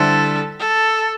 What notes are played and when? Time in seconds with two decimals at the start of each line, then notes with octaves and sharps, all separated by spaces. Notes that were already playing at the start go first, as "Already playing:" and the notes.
Already playing: D3 G3 E4 A4 C5
0.59 A4